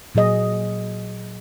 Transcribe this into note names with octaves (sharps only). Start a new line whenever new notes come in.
A#2 F#3 G#4 D#5